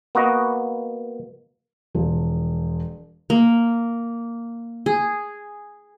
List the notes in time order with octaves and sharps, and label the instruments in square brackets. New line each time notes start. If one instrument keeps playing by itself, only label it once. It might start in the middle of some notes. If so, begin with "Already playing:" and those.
[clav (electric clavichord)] A#3 B3 F#4 D#5
[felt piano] E1 F3
[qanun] A#3
G#4